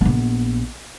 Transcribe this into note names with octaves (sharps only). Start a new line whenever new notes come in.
A#1 B3